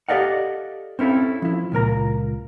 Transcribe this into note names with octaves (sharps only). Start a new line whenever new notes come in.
G4 A4 D5 D#5 F5 F#5
C4 C#4 E4 A4 F5
F3 E4
C#2 A#2 A#4 A#5